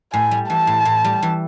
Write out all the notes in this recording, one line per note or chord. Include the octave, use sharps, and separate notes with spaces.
A2 G#5
G3
E3 A5
A2
A2
G3
E3